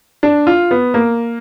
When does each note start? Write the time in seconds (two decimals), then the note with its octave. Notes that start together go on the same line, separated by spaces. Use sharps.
0.23 D4
0.47 F4
0.71 B3
0.94 A#3